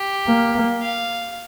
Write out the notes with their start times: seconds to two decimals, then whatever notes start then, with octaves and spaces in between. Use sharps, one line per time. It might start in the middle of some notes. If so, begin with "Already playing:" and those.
Already playing: G4
0.27 A#3
0.82 F5